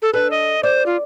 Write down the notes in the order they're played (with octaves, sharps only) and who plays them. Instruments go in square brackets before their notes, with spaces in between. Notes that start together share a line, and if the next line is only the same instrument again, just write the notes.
[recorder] A4
[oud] D4 A4 [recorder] B4
[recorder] D#5
[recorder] C5 [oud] D5
[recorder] F4